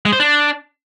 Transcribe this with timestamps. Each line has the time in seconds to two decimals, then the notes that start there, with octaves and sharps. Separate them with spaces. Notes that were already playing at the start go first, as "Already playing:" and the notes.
0.05 G#3
0.13 C5
0.20 D4